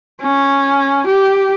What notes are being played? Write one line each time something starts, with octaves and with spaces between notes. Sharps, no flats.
C#4
G4